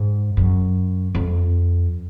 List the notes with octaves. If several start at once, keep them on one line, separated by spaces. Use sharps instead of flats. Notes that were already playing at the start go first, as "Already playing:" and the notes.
Already playing: G#2
F#2
F2